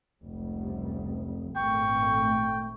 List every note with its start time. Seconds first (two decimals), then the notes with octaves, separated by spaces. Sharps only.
0.23 F1 C#2 G3
1.56 G#1 A#2 A3 G5 C#6